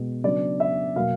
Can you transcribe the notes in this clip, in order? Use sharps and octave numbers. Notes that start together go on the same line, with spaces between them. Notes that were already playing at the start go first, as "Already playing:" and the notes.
Already playing: B2 G#3 B3
C#3 F#3 B3 D4 D5
E5
B2 F#3 A#3 F5